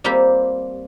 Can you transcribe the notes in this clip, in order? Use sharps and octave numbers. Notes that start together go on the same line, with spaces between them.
G3 A#3 C4 F4 G4